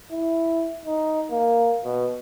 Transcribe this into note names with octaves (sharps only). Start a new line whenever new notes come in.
E4
D#4
A#3
B2